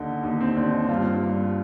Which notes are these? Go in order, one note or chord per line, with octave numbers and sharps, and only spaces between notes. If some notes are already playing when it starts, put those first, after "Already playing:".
Already playing: D#2 D3 D#4
D#2 D#4
C4
D#2 D4
D#4
G2 F4
G2